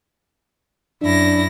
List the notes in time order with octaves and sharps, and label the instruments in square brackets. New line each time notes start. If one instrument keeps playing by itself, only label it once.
[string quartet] F#2 E4 A#6 [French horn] D4